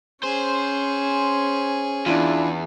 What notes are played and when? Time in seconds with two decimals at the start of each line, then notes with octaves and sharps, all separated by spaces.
0.24 C#4 G#4 C5
2.06 E2 D4 E4 F4